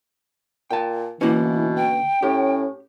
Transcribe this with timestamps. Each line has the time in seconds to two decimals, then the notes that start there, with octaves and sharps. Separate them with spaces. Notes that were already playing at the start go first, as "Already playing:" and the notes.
0.71 A#2 G5 A5
1.21 D2 B2 E3 A#3 C#4 E4
1.76 G5
2.23 A2 C#4 G4